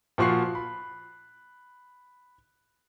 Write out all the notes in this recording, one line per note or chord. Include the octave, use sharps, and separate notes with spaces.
A#2 F3 F#4 C#6 F#6 C7
B5